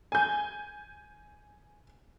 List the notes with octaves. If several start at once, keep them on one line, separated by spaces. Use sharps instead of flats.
G#5 G6